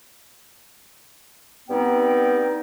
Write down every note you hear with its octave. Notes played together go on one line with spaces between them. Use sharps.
G2 B3 C4 D#4 G5